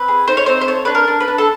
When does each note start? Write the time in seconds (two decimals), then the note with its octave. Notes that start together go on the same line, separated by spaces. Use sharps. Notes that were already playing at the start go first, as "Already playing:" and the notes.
Already playing: C4 B4
0.08 G#4
0.28 D#4 C5
0.37 C#5
0.46 C4 C5
0.61 C5
0.67 A4 C#5
0.85 D4 B4
0.95 A#4
1.08 D4
1.20 B4
1.28 D4
1.38 A4